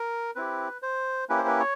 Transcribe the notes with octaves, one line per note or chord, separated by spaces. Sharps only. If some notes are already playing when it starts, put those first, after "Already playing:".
Already playing: A#4
C4 E4 G4 B4
C5
A#3 C#4 E4 G4 B4
C5
B4
C#5